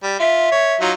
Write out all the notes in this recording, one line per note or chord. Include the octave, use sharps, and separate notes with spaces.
G3
F4 E5
C#5
F#3 D#4 F4